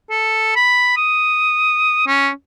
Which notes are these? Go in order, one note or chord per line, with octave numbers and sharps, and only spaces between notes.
A4
B5
D#6
C#4